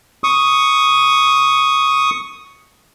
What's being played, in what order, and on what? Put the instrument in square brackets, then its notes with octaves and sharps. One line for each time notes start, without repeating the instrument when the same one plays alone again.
[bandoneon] C#6 D#6